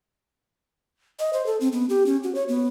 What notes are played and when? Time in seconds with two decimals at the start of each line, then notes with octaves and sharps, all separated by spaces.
1.19 D#5
1.33 C5
1.46 A4
1.60 C4
1.72 B3
1.89 G4
2.06 C#4
2.23 F#4
2.35 C#5
2.48 B3